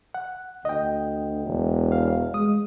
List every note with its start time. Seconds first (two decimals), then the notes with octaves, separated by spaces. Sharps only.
0.14 F#5
0.65 D2 D#5 G5
1.47 E1
1.92 F5
2.34 G#3 D#6